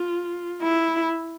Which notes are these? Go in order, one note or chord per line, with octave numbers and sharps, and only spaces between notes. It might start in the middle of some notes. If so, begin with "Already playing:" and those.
Already playing: F4
E4